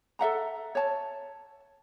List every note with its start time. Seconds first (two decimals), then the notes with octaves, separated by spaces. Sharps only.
0.19 A4 E5 F#5 A#5
0.75 C#5 A5